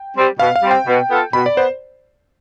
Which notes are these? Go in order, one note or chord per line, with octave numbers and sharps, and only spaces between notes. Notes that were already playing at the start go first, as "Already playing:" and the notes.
Already playing: G5
G3 C4
B2 F5
F5
G3 C4
G5
B2
B3 F4 A4
B2 B5
D5
B3 C5